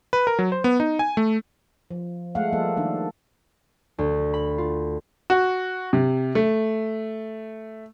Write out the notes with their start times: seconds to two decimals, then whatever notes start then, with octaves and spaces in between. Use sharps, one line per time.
0.13 B4
0.27 A#4
0.39 F#3
0.52 C5
0.64 B3
0.80 D#4
0.99 G#5
1.17 A3
1.91 F3
2.35 G#3 A3 F5 F#5
2.52 F3 G3 A#3 A4
2.77 D#3 D4
3.98 D2
4.34 B5
4.58 F4
5.30 F#4
5.93 C3
6.35 A3